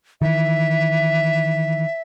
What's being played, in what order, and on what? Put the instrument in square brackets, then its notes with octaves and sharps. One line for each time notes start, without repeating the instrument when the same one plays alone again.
[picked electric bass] D#3 E3 [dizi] E5